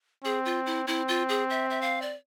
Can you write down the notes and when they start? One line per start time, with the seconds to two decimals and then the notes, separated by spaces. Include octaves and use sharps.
0.24 C4 G#4
0.45 F4
0.66 E4
0.87 C4 E4
1.08 F4
1.29 G#4
1.50 E5
1.70 E5
1.81 F5
2.02 D5